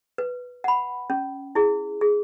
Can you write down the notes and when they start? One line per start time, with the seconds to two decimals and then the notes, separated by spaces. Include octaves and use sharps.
0.18 B4
0.64 F#5 B5
1.10 C#4
1.55 E4 G#4
2.01 G#4